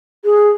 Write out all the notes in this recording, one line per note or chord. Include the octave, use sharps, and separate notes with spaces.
G#4